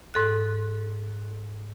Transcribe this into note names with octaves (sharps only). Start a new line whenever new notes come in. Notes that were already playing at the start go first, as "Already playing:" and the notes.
G#2 A4 F#6